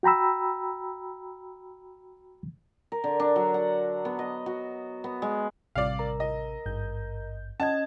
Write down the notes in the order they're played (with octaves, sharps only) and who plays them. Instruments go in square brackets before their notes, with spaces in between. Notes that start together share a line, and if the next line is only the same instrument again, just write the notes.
[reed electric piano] F#4 G5 A#5 B5 E6
[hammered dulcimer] A#4
D3
D4
F#3
F#5
B3
D#5
F#4
B3
G#3
[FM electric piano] A1 C3 G3 [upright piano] D5 F5
[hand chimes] A#4 A#5
[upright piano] D#5
[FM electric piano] G#1 G2 G6
[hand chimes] C#4 D#5 G#6 [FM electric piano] F#5 [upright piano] A5